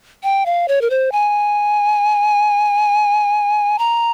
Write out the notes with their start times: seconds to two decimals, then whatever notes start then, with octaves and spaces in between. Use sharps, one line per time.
0.23 G5
0.46 F5
0.68 C#5
0.81 A#4
0.90 C5
1.12 G#5
3.79 A#5